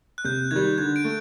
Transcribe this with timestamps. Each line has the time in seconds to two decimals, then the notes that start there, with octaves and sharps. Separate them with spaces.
0.18 F#6
0.24 C3 G6
0.51 D#3 G3 G#6
0.78 D3 G#6
0.96 D7
1.04 A3